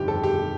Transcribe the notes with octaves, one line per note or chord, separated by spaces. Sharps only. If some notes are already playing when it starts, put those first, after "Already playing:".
Already playing: G1 F2 D#3 G4
A4
G4
D#3